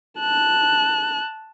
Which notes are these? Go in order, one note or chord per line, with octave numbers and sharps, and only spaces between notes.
A5 F#6